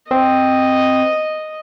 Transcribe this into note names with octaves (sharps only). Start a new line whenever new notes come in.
C4 D#5